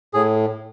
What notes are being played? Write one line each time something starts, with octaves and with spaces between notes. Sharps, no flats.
A2 G#4